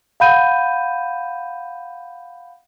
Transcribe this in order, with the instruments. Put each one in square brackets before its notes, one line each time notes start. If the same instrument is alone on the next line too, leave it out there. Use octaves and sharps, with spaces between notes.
[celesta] F5 F#5 B5 G6 D#7